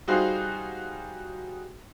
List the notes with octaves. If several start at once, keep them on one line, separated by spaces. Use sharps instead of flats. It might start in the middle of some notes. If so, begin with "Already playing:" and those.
G3 D#4 F4 F#4 G#4 C5